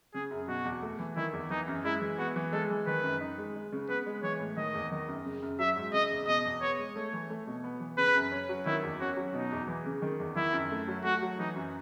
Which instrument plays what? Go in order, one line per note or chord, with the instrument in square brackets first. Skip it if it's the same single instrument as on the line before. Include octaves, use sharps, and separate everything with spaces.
[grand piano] C#3 [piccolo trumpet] G#4
[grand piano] F#2
[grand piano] B2 [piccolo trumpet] F#4
[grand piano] E2
A3
E3
[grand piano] D#3 [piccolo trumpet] E4
[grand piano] E2
[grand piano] E3 [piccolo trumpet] D#4
[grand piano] F#2
[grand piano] G#3 [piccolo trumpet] E4
[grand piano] E3
[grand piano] B3 [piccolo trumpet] F#4
[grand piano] E3
[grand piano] G#3 [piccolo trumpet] A4
[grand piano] E3
[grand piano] D#3 [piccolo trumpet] B4
[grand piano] F#2
D#4
G#3
G#3
C#3
[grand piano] B3 [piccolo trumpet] B4
[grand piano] G#3
[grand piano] E3 [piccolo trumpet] C#5
[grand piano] A2
[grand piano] D#3 [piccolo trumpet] D#5
[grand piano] E2
D#3
F#2
C#3
F#2
[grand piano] F#3 [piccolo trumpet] E5
[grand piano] G#2
[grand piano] C#3 [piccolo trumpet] D#5
[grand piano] E2
[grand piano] B2 [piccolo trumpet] D#5
[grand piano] E2
[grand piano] B3 [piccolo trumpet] C#5
[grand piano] G#3
[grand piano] A3 [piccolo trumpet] C#5
[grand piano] E3
A3
B2
B3
E3
[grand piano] C#3 [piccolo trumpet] B4
[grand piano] F#2
C#4
F#3
[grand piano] D#3 [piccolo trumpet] E4
[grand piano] E2
[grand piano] C#4 [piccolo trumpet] F#4
[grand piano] F#3
[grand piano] B2 [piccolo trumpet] D#4
[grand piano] E2
E3
C#3
D#3
E2
[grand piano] D#3 [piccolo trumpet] E4
[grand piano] F#2
A3
F#3
[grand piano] A3 [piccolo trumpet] F#4
[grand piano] F#3
[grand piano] E3 [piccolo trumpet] D#4
[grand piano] F#2